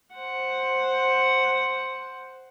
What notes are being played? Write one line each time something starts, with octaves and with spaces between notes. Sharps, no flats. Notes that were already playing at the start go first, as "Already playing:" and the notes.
C5 F#5